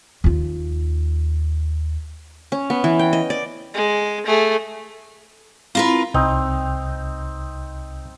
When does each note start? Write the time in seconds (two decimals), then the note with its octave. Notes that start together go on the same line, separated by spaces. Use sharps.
0.24 D#2 F4
2.52 C#4
2.70 B3
2.84 E3
2.99 G5
3.13 D#5
3.30 D5
3.75 G#3
4.26 A3 G#4
5.75 C4 E4 F4 A#4 B4 C6
6.14 C2 C4 D#4